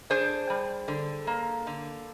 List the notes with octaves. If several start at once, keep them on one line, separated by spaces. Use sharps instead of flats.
D4 G#4 C5
G3
D3
A#3
D3